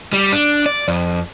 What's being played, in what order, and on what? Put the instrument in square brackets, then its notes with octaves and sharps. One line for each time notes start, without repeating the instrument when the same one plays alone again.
[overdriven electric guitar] G3
D4
D5
F2